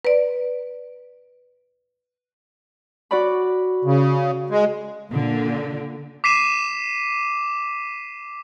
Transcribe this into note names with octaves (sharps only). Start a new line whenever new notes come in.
B4 D5
F#4 D5 B5
C#3
G#3
A#2 D3
D6 B6 C7 D#7 E7